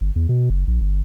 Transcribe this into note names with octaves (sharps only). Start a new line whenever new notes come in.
G1
E2
B2
F#1
A#1
G1